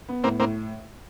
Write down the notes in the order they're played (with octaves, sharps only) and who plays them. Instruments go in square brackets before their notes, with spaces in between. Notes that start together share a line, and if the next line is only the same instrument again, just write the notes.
[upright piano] B3
[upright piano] A2 [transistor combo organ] A#3 C4
[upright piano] A2 [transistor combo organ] A#3 C4